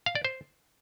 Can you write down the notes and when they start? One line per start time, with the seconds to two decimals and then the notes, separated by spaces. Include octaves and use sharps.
0.06 F5
0.15 D5
0.25 C5